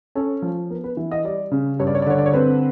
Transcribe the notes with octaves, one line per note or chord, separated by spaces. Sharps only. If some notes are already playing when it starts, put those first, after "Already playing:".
C#4 A4
F3
B3 A#4
B4
E3
D#5
G3 D5
C#3
G2 C#5
D5
C#5
D5
D3 C#5
D5
C#5
C4 B4